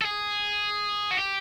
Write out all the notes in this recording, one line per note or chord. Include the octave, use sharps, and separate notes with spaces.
A4
G#4
F#4
G4